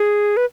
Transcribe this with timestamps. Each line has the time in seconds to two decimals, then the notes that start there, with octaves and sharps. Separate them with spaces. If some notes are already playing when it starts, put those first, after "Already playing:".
Already playing: G#4
0.37 B4